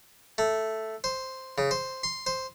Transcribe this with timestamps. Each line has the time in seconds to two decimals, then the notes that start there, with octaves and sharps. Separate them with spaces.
0.38 A3
1.04 C5
1.58 C#3
1.71 C5
2.03 C6
2.26 C5